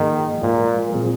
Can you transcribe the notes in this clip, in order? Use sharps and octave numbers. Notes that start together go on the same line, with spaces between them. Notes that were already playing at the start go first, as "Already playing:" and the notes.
Already playing: G#2 D#3 F3 A#3 G#4
A#2 F3 G#3 F4 A#4
A#2 F3 C4 F4 G#4